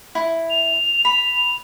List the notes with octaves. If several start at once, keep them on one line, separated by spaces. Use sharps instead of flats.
E4
F7
B5